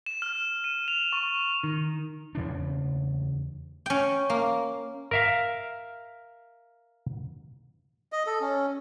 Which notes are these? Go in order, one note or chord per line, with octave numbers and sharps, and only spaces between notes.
E7
F6
D#7
F7
C#6
D#3
E2 C#3 D4
C#4 G5
A#3
A#4 E5 F5
D#5
A4
C#4